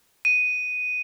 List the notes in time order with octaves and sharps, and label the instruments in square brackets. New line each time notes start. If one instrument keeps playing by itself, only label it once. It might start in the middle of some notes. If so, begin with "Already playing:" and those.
[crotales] D#7